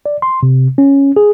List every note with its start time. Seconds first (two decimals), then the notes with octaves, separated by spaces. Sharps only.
0.06 D5
0.22 C6
0.43 C3
0.78 C#4
1.16 G#4